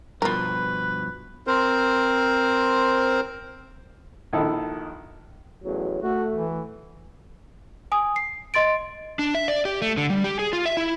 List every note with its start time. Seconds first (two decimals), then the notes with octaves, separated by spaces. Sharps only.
0.22 G2 B2 F3 F4 A#4 B4
1.47 C4 A#4 C5
4.33 A#1 D#3 E4 A4
5.64 A1 E2 F#3
6.03 A3 F#4
6.32 E3
7.92 G#5 D#6
8.16 C7
8.54 D#5 C6 A6 D7
9.19 D4
9.35 E5
9.48 D5
9.65 G4
9.82 A3
9.97 D3
10.10 G3
10.24 G4
10.39 G#4
10.53 F4
10.66 E5
10.77 E4